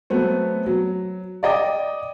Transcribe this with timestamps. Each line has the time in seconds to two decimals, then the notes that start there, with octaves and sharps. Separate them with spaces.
0.10 F#3 A3 B3 C4
0.66 F#3
1.43 D5 D#5 G5 D6